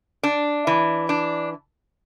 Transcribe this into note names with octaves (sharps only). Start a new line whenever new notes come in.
D4
E3
D4